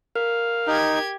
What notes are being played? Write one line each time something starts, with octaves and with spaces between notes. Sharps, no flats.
A#4 F5
D#4 G4 G#6